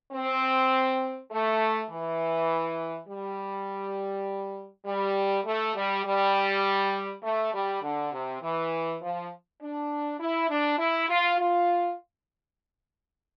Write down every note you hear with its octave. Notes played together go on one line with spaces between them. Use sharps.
C4
A3
E3
G3
G3
A3
G3
G3
A3
G3
D3
C3
E3
F3
D4
E4
D4
E4
F4
F4